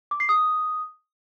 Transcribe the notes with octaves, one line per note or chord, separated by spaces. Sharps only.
D6
C7
D#6